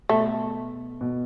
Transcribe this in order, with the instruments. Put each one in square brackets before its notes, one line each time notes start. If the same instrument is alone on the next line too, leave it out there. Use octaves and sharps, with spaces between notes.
[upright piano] B2 [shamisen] A3
[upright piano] B2